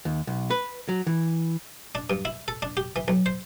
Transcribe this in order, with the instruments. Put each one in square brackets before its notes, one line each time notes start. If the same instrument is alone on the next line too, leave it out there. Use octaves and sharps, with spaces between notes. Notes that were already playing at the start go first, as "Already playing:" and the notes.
[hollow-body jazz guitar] D#2
B1
B4
F#3
E3
[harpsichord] D4
G2
E4
A4
D4
G4
E3
B1
C5